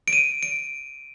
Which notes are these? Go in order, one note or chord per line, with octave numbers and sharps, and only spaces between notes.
D7
D#7
D7